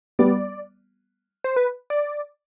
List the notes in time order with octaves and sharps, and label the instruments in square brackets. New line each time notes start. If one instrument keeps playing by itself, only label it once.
[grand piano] G3 B3 [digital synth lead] D5
[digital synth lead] C5
B4
D5